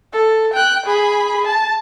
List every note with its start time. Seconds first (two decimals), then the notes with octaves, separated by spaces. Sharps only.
0.13 A4
0.54 G5 F#6
0.86 G#4 B5
1.45 A5